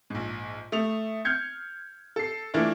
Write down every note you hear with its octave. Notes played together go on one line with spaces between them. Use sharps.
A#1 G#2
A3 D#6 F7
F6 G6 G#6 C#7
A4 C7
E3 A3 A#3 D4 E4 F4